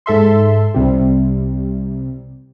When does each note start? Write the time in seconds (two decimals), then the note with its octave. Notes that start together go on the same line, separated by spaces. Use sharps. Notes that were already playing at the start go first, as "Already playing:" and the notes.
0.06 G#2 A4 E5 C6
0.74 C2 C3 G3